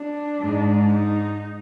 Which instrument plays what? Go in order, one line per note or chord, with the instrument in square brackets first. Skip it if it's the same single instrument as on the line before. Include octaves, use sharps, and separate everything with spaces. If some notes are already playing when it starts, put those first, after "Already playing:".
Already playing: [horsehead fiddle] D4
[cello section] G#2
[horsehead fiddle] D#4